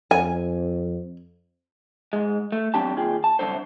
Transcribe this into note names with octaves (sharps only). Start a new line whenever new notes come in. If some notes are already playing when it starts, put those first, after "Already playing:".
F2 G#5
G#2 G#3
A3
E2 F#3 C4 D4 G4 A5
D#2 F4 G#4 G5
A5
C2 F#2 D3 A4 C5